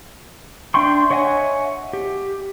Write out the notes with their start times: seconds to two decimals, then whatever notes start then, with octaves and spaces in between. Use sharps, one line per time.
0.74 D4 E5 G5 C6 C#6
1.11 C#5 D#5 E5 F#5 G#5
1.93 G4